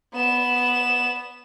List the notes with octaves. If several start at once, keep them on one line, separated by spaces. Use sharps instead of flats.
B3 E7